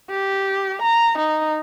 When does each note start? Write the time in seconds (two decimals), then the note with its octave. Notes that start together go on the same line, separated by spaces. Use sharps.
0.10 G4
0.82 A#5
1.18 D#4